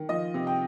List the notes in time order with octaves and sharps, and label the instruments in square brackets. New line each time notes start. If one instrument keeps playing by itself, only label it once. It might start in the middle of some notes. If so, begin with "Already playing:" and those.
Already playing: [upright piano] D#3
F3 D#5
C3
G5